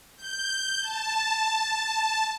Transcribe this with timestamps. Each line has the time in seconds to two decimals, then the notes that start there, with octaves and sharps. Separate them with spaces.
0.16 G6
0.81 A5